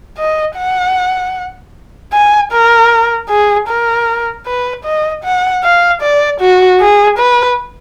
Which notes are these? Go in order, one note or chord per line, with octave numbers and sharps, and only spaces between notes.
D#5
F#5
G#5
A#4
G#4
A#4
B4
D#5
F#5
F5
D5
F#4
G#4
B4